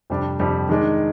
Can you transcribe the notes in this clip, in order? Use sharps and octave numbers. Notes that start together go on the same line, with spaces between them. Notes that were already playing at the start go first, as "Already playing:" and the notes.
F2 C3 G3 D4
F2 C3 G3 D4
D#3 G#3 D4